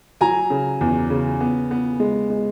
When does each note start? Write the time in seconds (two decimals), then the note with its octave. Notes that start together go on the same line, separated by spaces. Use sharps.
0.21 F#3 G#5 A#5
0.50 C#3
0.81 E2
1.10 C#3
1.40 B3
1.71 B3
2.00 G#3
2.30 G#3